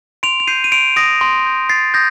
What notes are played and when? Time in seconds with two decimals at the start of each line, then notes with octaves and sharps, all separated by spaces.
0.23 C6 D7 F7
0.40 F7
0.47 G6 C7 D#7
0.64 D#7
0.72 C6 D7 F7
0.96 D#6 A#6 D7
1.21 C6
1.46 G6
1.69 C6 A6 C7
1.94 D#6 G6 A#6